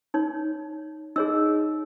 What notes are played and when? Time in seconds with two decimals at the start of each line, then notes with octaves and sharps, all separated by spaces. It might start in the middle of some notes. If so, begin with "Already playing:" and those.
0.14 D#4 C#5
1.16 D#4 G#4 C#5 E6